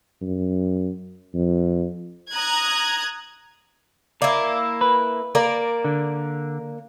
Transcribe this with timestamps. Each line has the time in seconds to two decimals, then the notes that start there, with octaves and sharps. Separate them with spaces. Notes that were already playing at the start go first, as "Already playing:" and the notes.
0.22 F#2
1.35 F2
2.31 A#5 D#6 F#6 G#6
4.22 A#3 E4 D5
4.81 B4
5.35 A#3 A#4 D5
5.85 D3